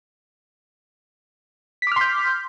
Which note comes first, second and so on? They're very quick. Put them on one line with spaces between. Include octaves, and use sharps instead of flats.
B6 D6 F6 C6 G6